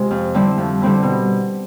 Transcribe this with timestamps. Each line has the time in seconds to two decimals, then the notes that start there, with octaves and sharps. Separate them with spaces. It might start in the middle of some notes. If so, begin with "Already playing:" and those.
Already playing: C3 G#3 F4
0.11 F2
0.34 D3 G3 C4 E4
0.58 F2
0.82 D3 G3 C4 E4
1.03 B2